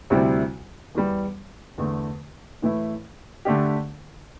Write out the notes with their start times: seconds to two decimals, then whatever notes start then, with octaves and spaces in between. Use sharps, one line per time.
0.10 D2 C3 G3 C4 E4
0.95 E2 E3 G3
1.78 E2 D3 A3
2.62 A2 E3 A3 E4
3.45 D3 A3 D4 G4